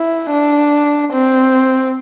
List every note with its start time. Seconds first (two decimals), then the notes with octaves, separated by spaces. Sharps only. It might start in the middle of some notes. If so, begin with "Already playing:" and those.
Already playing: E4
0.31 D4
1.12 C4